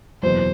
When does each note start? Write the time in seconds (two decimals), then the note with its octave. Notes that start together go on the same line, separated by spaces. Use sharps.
0.23 F#1 E2 B2 F#3 C5